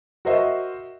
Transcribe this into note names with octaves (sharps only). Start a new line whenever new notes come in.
F#4 A#4 C5 D#5 E5